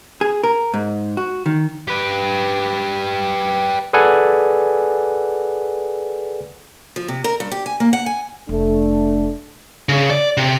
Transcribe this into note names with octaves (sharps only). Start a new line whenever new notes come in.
G#4
A#4
G#2
F#4
D#3
G4 B4
G#4 A4 B4 D5 F#5 G#5
F3
C3
A#4
G2
G4
G#5
A#3
F#5
G#5
F1 A3 D4
C#3
D5
C3